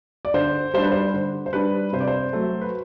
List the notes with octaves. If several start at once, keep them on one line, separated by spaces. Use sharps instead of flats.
D5
D3 C5
G3 D4 C5
B4
C5
D3
C5
G3 D4 B4
C3 C5
D5
C5
F#3 A3
B4